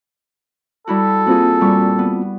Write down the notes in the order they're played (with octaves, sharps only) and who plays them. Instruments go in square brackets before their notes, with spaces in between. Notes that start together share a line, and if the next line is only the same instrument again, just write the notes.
[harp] G3 E4 F#4 [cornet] A4
[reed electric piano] A#3 C4 F4 [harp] F#4 G#4
[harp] A#2 G3 C#6
B3